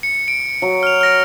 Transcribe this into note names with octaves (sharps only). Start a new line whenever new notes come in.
C#7
D7
F#3
F6 F7
F6 A#6 D7